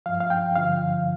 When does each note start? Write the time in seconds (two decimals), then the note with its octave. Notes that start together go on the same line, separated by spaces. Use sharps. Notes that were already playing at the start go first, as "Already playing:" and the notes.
0.06 G2 F3 F5
0.21 F5
0.30 G5
0.55 G2 D3 F3 F5